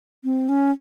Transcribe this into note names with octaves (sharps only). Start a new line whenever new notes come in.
C4
C#4